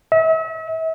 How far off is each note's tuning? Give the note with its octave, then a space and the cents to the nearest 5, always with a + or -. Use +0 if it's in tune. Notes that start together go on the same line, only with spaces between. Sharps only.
E5 -40